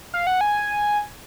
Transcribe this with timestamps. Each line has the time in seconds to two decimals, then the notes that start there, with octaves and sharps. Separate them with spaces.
0.14 F5
0.27 F#5
0.41 G#5